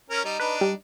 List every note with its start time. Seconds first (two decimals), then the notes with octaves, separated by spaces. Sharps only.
0.10 C#4 A#4
0.25 G3 D#4
0.40 D4 D#4 B4
0.61 G3